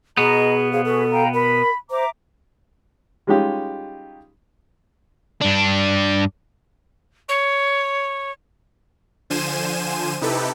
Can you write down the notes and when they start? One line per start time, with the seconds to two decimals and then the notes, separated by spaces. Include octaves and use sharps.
0.17 B2 B3 G#4 D#5 A#5
0.72 G#4 C5 F5
0.85 F#4 G#4 A4 B4
1.11 F5 G5 A#5
1.33 A#4 B5
1.90 C5 E5 A#5 D6
3.27 G3 G#3 C#4 D#4 F4 G4
5.41 G2 D4
7.28 C#5
9.30 D3 F3 C5 G#5 D#7 E7
10.21 C3 D#4 E4 G4 A4 B4